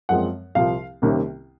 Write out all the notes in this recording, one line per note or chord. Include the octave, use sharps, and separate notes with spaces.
F#2 F3 G#3 C4 F#5
C2 C3 F3 F5
C2 C3 D#3 A#3 C#4